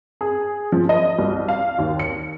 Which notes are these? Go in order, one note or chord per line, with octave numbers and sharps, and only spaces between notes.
G#4
F3
D#5
C2
F5
D#2
C#7